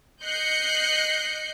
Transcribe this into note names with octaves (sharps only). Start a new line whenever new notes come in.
D#5 F#6 G6 C7 C#7